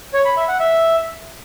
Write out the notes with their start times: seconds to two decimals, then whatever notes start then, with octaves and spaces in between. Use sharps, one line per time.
0.14 C#5
0.25 B5
0.37 E5
0.48 F#5
0.60 E5